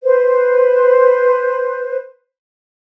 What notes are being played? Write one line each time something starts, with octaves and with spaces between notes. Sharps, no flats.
B4 C5